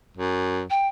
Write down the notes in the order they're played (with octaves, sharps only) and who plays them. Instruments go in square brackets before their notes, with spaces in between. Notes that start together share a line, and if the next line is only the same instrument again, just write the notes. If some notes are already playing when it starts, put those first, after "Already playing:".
[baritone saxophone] F#2
[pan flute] G5